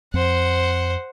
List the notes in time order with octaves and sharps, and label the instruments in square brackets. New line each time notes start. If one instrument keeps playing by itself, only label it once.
[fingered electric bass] F2 C4 [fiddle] C5 F#5